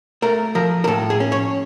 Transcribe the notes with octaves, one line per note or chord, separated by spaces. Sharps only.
A3 A#4
F3 A#4
A#4
A2 A4
G#4
C#4
C#5